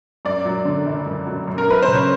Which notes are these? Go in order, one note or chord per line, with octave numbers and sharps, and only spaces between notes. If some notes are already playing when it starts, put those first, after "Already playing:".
F#2 D5
F#3
D3
F#1
F#2
F#3
F#2
A#4
F#3 B4
C5
C#3
C#5